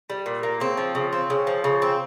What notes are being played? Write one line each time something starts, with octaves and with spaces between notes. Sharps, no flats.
G3
A#2
A#3
C#3 C4
F3
C#3
C4
C#3
F3
C#3
C4